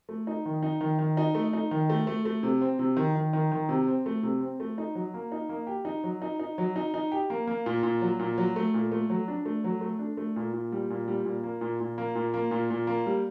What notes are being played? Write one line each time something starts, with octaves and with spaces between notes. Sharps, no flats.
A3
D#4
D#3
D#4
D#3
D#3
D#4
A3
D#4
D#3
A3
A3
A3
C3
C4
C3
D#3
D#3
D#3
D#3
C3
C4
A3
C3
C4
A3
D#4
F#3
A#3
D#4
A#3
G4
D#4
F#3
D#4
D#4
F#3
D#4
D#4
G4
A#3
A#3
A#2
A#2
F#3
A#2
F#3
A3
A#2
A3
F#3
D4
A3
F#3
A3
D4
A3
A#2
A#2
G3
A#2
G3
A#2
A#3
A#2
A#2
A#3
A#2
A#3
A#2
A#2
A#3
G3